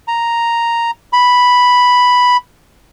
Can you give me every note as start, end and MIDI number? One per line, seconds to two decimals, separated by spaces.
0.08 0.91 82
1.13 2.37 83